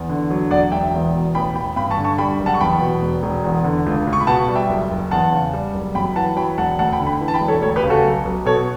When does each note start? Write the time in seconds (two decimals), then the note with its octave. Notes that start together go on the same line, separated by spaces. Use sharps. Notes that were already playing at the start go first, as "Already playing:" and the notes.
Already playing: E2
0.09 D3
0.30 F#3
0.51 E1 D5 F#5
0.72 E1 E5 G5
0.93 E2
1.14 B2
1.35 A1 G5 B5
1.55 A1 G5 B5
1.76 G2 G5 B5
1.91 A5 C#6
1.98 D3
2.04 A5 C#6
2.18 G3 G5 B5
2.39 F#1
2.46 F#5 A5
2.54 C#6
2.60 E2 G5 B5
2.81 B2
3.02 E1
3.23 E1
3.44 E2
3.64 D3
3.86 C#2
4.07 C#2
4.13 C#6
4.20 B5
4.27 B2 F#5 A5
4.48 G3
4.55 E5 G5
4.69 F#1
4.91 F#1
5.11 E2 F#5 A5
5.32 C#3
5.53 G3
5.74 F#1
5.95 F#2 G5 B5
6.16 E3 F#5 A5
6.36 F#3 G5 B5
6.58 E1 F#5 A5
6.79 D2 F#5 A5
6.93 G5 B5
7.00 D3
7.06 G5 B5
7.21 E3
7.28 A5
7.34 G5 B5
7.41 E1
7.48 A4 C#5
7.62 D2 A4 C#5
7.76 G4 B4
7.84 C#3
7.90 F#4 A4
8.05 B1
8.25 B1
8.45 B2 A4 C#5